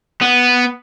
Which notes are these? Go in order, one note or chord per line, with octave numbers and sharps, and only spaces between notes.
B3